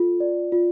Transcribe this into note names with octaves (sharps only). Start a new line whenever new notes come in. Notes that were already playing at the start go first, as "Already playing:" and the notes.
Already playing: F4 A4
D5
F4